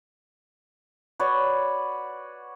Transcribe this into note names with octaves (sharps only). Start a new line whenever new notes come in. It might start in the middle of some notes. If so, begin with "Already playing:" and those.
F#4 B4 C#5 D5